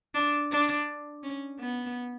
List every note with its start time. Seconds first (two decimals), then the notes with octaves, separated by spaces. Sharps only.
0.15 D4
0.51 D4
1.23 C#4
1.60 B3